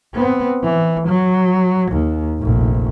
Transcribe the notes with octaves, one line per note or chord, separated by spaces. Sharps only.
B3 C4
E3
F#3
D#2
F1 A#1